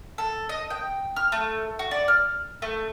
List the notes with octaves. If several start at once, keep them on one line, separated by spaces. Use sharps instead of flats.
A4
D#5
G5
F6
A3
F#4
D5
F6
A3